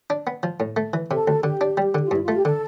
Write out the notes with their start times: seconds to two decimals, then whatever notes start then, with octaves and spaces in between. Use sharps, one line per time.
0.10 D4
0.27 B3
0.43 F3
0.60 A2
0.76 A3
0.93 E3
1.11 C3 A4
1.28 D2
1.43 D3 G4
1.61 D4
1.77 G3
1.95 D3
2.05 F4
2.11 G2 E4
2.22 F4
2.28 A3
2.34 G4
2.45 D3 A4